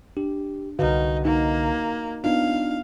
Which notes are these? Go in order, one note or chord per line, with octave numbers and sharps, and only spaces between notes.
D4 G4
C2 D3 D#4 F#4 B4 F5
A#3 D#4
B3 D4 D#4 F4 F5